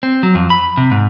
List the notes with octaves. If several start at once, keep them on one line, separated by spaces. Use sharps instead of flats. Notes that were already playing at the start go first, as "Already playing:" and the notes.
C4
F#3
F2
B5
C3
G#2